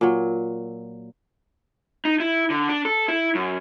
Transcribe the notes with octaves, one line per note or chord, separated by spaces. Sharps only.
A#2 F#3
D#4
E4
D3
D4
A4
E4
F#2